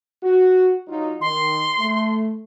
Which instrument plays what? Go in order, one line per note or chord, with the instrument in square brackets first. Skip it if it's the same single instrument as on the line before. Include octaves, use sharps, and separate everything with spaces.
[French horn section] F#4
F#3 D#4 F4
[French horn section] D#3 [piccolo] C6
[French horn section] A3